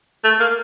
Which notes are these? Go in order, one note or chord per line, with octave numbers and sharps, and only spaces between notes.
A3
A#3